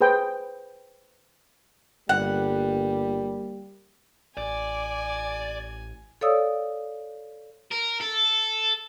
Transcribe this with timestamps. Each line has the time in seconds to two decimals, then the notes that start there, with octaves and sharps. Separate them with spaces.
0.01 G#4 B4 C5 G5
2.09 G1 G3 A#3 F#5
4.37 A1 D5 G#5
6.21 A4 C#5 D5 F5 D#6 E6
7.72 A#4
8.01 A4